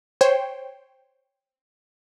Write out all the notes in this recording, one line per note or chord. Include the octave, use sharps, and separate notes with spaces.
C5 C#5 G5